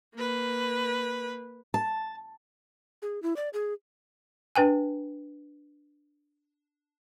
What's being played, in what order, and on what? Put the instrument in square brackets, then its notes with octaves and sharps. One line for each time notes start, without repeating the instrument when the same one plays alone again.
[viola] A#3 B4
[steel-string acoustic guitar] A5
[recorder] G#4
E4
D5
G#4
[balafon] D4 B4 G5 G#5